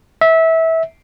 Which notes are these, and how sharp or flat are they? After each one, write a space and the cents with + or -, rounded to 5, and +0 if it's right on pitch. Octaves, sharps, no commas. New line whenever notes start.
E5 -20